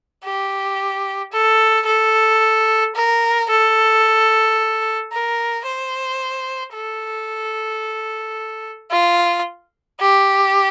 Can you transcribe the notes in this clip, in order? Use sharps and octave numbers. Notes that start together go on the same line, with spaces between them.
G4
A4
A4
A#4
A4
A#4
C5
A4
F4
G4